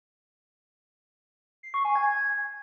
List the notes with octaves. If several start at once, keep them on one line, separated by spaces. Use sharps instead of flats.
C7
C#6
G#5
G#6